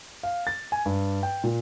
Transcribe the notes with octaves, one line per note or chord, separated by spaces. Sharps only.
F5
A6
G#5
G2
G5
A#2